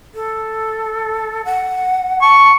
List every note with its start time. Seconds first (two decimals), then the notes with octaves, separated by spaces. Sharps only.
0.15 A4
1.45 F#5
2.21 A5 C#6